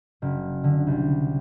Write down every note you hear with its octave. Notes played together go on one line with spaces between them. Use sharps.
F#1
D3
C2